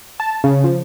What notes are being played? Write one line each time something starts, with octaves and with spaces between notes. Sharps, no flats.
A5
C#3
F3